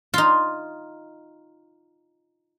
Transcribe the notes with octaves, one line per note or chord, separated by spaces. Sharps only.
D#4 F4